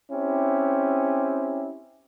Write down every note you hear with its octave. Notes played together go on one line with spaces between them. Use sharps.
C4 C#4 E4 G4